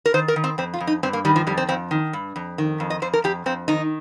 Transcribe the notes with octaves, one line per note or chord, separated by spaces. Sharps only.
A#4
D#3 C5
A#4
D#3
C4
F2 C4
F4
F2
D#4
G2 C4
A#3
D#3 G3
F3
F2 G3
C4
F2 C4
D#3
G2
F2
D#3
F2
D#5
F2 C5
A#4
F2 G4
F2 C4
D#3 D#4